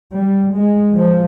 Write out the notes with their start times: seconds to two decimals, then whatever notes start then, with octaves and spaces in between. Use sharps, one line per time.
0.17 G3
0.55 G#3
0.95 F3